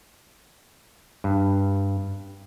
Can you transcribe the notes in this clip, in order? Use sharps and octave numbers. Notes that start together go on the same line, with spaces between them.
G2